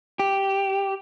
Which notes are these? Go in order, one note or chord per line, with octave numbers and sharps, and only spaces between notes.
G4